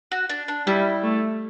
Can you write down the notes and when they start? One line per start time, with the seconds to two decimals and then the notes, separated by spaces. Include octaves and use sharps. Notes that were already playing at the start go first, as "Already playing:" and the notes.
0.12 F#4
0.29 D4
0.48 D4
0.67 G3 E4
1.03 A3